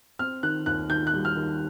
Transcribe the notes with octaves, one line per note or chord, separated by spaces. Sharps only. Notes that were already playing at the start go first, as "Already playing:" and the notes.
C4 F6
D#3 F#6
D#2 F#6
D#3 G6
F#6
G3
F6
D#3